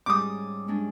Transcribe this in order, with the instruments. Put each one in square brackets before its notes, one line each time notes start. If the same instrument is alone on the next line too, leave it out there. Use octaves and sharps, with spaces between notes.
[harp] G#2 G3 C#4 [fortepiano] D6 D#6
[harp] G#3 C#4 D4